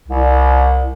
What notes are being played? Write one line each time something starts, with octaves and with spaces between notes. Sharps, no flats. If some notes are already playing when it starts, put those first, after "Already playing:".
C2